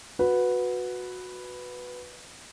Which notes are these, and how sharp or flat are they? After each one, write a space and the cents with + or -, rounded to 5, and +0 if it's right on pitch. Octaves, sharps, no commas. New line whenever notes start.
F#4 -15 B4 +0